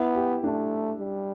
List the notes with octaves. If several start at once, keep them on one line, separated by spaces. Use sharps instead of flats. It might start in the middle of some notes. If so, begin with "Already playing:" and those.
Already playing: B3 E4
G4
A3 D4
G3